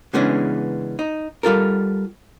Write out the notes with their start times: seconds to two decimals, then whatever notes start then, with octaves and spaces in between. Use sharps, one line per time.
0.14 C#3 E3 G#3 B3 C#4 D4
0.99 D#4
1.43 G3 F4 A4 A#4